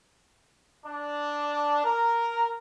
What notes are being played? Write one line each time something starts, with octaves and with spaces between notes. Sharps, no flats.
D4
A#4